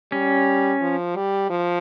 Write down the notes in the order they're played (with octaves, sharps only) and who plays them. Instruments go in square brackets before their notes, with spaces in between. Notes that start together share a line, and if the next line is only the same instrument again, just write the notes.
[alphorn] G3 [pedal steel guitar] C#4
[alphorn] F3
G3
F3